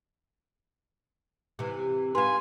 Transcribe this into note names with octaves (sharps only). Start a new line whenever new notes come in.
C3 E3
F4 B4 G#5 C6